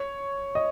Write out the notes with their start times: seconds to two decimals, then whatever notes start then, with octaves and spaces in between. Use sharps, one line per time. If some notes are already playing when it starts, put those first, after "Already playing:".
Already playing: C#5
0.55 D#5